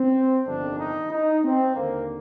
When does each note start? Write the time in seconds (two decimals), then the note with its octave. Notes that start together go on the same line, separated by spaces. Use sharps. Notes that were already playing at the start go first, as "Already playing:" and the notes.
Already playing: C4
0.47 G1 F2 C3 D#3 D4
0.79 D#4
1.11 D#4
1.44 C4
1.75 D#2 D3 A#3